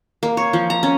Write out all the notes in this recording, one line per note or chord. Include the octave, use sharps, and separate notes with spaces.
A#3
C#5
F3
A#5
C#4